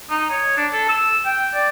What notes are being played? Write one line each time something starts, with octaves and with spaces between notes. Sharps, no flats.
D#4
C#5
D4
A4
E6
G5
D5